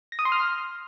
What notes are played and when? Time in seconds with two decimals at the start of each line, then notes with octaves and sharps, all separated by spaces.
0.12 A#6
0.19 D#6
0.25 C6
0.32 F6